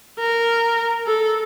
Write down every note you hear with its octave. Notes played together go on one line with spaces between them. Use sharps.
A#4
A4